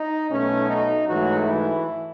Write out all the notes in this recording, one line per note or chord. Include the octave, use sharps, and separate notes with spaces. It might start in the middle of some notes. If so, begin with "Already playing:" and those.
Already playing: D#4
B1 B2 A3 C#4
D#4
G#2 E3 F#3 A3 F#4
E3 E4